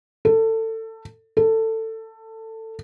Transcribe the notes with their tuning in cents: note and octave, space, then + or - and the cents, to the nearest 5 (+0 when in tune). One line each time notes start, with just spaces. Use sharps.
A4 +25
A4 +20